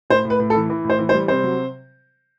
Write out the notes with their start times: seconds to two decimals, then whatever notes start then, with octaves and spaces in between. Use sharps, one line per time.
0.10 A2 C5
0.25 A2
0.30 B4
0.39 A2
0.50 A4
0.55 E3
0.70 E3
0.84 A2
0.90 C5
0.99 E3
1.09 C5
1.14 G3
1.28 C3 C5
1.44 F#3